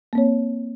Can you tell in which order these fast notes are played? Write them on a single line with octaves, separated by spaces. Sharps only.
A#3 C4 C#5